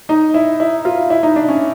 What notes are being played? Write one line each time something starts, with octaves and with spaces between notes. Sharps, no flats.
D#4
E4
E4
F4
E4
D#4
D4
C#4